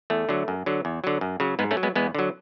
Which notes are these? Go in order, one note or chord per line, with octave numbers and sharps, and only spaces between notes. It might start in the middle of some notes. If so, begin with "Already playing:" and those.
E2 A3
D3 F#3
F#2
D3 F#3
E2
D3 F#3
F#2
C#3 F#3
G#2 G#3 B3
A3 C#4
F#3
G#3 B3
E2 G#3 B3
D3 F#3